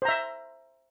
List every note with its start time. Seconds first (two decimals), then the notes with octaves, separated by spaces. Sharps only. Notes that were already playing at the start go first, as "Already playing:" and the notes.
0.02 C5
0.05 A#5
0.09 E5